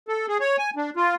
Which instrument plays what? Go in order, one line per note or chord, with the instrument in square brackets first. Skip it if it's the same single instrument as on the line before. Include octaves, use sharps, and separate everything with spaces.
[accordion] A4
G#4
C#5
G#5
D4
F4